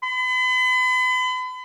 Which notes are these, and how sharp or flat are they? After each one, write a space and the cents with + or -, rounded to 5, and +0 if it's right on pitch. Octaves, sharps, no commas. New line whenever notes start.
B5 +40